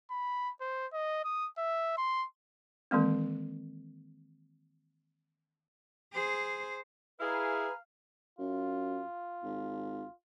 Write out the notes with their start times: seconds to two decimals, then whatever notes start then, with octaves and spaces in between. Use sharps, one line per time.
0.11 B5
0.61 C5
0.93 D#5
1.25 D#6
1.58 E5
1.98 C6
2.91 D#3 E3 G#3 A#3 C4
6.13 G#4 C5
7.20 E4 G#4 B4 F5 G#5 A#5
8.39 F#2 F4
9.43 G#1